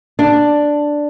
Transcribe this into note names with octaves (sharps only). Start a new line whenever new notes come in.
D4